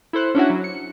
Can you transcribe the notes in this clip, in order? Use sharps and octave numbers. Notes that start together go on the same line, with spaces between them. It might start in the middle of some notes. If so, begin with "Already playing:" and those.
E4 A4 C5 F#6
C#4 D4 E4 F#4
F#3
C#7